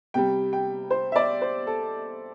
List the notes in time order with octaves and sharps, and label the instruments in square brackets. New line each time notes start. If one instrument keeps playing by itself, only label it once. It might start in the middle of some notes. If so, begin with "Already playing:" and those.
[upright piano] C3 G3 G5
G5
C5
E5
D5
C5
A4